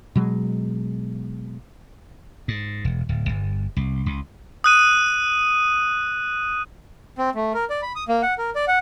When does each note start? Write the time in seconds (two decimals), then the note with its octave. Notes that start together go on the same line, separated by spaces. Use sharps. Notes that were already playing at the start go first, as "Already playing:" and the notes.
0.16 B2 F#3 G#3
2.48 G#2
2.85 E1
3.09 D1
3.29 G1
3.77 C2
4.06 C#2
4.64 D#6 F#6 D#7
7.18 C4
7.35 A3
7.54 A#4
7.70 D5
7.82 B5
7.95 D#6
8.09 A#3
8.22 F#5
8.38 A#4
8.55 D5
8.68 F#5